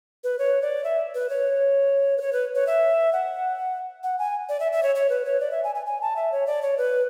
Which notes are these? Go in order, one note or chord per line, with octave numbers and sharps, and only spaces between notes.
B4
C#5
D5
E5
B4
C#5
B4
C#5
B4
C#5
E5
F#5
F#5
G#5
D5
E5
E5
C#5
C#5
B4
C#5
D5
E5
G#5
G#5
G#5
A5
E5
C#5
D5
C#5
B4